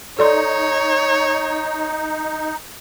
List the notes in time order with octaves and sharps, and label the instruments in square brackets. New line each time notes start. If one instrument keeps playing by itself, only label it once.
[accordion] D#4 [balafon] A4 D5 C6 [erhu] C#5